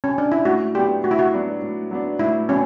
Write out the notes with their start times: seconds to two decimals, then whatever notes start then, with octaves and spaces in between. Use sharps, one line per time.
0.04 C#4
0.18 D4
0.32 E4
0.45 A2 F#4
0.74 F#3 B3 D4 G4
1.04 A2 F#4
1.11 E4
1.19 F#4
1.33 F#3 B3 D4
1.61 A2
1.91 F#3 B3 D4
2.19 A2 E4
2.48 F#3 B3 C#4 D4